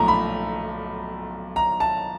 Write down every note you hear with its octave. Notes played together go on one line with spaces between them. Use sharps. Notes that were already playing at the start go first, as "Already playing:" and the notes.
Already playing: B1 A#2 F3 A3 A#5
B5
A#5
A5